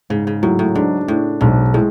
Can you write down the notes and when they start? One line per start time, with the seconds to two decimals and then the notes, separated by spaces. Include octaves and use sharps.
0.10 G#2 C#3
0.27 C#3
0.43 A2 F#3
0.59 A2
0.75 G#2 D4
1.08 A2 D4
1.41 B1 G#2
1.74 A2 G#3